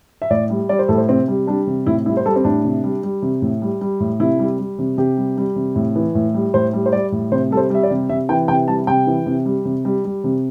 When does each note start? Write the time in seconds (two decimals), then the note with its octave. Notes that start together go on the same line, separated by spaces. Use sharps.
0.22 E5
0.30 A2 D5
0.50 G3
0.69 G3 D5
0.79 C5
0.88 A2 A4
0.98 C5
1.09 C3 C4
1.28 G3
1.47 G3 D4
1.67 C3
1.87 A2 E4
2.06 G3 E4
2.17 C5
2.26 G3 A4
2.36 C4
2.44 A2 D4
2.64 C3
2.84 G3
3.03 G3
3.22 C3
3.42 A2
3.62 G3
3.81 G3
4.00 A2
4.20 C3 E4
4.39 G3
4.59 G3
4.79 C3
4.98 C3 G4
5.17 G3
5.37 G3
5.56 C3
5.76 A2
5.95 E3
6.15 A2
6.34 G3
6.54 A2 C5
6.73 G3
6.86 C5
6.92 G3 D5
7.12 A2
7.31 C3 C5
7.51 G3 A4
7.57 C5
7.70 G3 E5
7.83 D5
7.91 C3
8.09 C3 E5
8.29 E3 G5
8.48 C3 G5
8.68 G3 A5
8.87 C3 G5
9.07 E3
9.26 C3
9.46 G3
9.65 C3
9.85 G3
10.05 G3
10.24 C3